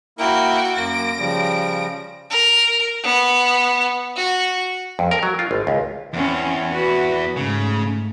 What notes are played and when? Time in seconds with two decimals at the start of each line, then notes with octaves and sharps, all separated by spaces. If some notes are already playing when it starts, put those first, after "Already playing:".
0.19 A#3 E4 F#4 A#4 G5
0.76 F#2 A#3 A#6 D7
1.19 C#3 F3 G3
2.30 A#4
3.04 B3
4.16 F#4
4.99 F2
5.11 A#4
5.23 F#3
5.39 F4
5.51 G#1
5.67 C#2
6.13 E2 C4 C#4
6.72 F#4 B4
7.37 G#2 C#3 A3